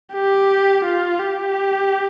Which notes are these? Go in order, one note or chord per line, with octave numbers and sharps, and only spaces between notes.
G4
F4
G4